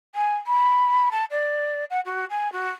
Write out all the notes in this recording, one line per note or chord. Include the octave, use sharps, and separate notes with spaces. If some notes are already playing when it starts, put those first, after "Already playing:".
G#5
B5
A5
D5
F#5
F#4
G#5
F#4